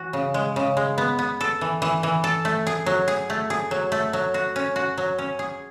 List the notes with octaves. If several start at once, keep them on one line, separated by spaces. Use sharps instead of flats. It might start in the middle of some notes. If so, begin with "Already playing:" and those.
Already playing: E3 F#4
C#3
G#3
C#3
G#3
B3
B3
A4
E3
E3
E3
A4
A3
G#4
F#3
G#4
A3
G#4
F#3
A3
F#3
F#4
C#4
F#4
F#3
C#4
G#4